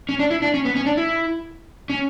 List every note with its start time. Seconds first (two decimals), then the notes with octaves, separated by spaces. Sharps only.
0.09 C#4
0.19 D4
0.31 E4
0.42 D4
0.54 C#4
0.65 B3
0.76 C#4
0.86 D4
0.97 E4
1.90 C#4